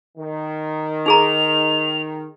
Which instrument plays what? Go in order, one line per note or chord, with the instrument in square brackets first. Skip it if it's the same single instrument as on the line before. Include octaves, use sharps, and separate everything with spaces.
[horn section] D#3
[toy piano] D#4 G#4 A#5 [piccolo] F7